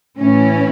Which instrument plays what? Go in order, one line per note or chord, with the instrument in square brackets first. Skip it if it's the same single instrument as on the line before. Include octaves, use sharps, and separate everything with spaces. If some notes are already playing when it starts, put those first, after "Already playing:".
[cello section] A2 E3 A3 C#4